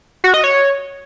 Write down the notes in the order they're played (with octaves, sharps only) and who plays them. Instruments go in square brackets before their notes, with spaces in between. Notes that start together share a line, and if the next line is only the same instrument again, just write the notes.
[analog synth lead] F#4
D#5
C#5